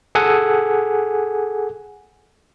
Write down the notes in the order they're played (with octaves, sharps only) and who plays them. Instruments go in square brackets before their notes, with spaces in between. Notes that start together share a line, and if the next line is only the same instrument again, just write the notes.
[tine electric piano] G#4 A4 F#5 G#5